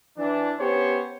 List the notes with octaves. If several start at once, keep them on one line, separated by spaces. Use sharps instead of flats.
E3 D4
B3 C#4 G4 C5 C#5